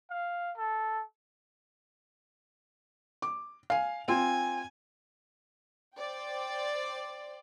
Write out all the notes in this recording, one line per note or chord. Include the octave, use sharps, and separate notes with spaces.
F5
A4
D6
F5 G#5
C4 F4 G#5
C5 D5 G5